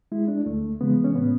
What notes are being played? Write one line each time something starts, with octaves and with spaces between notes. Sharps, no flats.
G#3 E4
D4
D2 A3
C#3 E3 G#3 B3
C#4
A2 B3